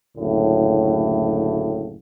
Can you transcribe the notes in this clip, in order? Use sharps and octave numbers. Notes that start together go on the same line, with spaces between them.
F#1 D2 A2